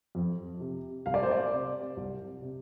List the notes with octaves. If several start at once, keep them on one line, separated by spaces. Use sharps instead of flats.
F2
C3
C2 F5
D5
C5
D5
C3
C2
C3